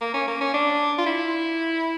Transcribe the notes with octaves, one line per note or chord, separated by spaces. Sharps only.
A#3
C#4
A#3
C#4
D4
F4
E4